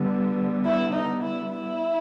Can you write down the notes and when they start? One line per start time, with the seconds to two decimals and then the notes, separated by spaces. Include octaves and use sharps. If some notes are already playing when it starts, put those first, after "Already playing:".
Already playing: D3 G3 B3
0.65 E4
0.93 D#4
1.22 E4
1.51 E4